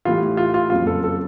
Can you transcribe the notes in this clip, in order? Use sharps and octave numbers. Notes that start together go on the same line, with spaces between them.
A2 E3 G3 F4
F4
F4
F#1 F2 C#3 F#3 F4
A4
A4